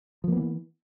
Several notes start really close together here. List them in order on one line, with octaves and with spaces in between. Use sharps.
F3 A#3 B3 E3